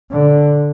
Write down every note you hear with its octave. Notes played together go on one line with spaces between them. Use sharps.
D3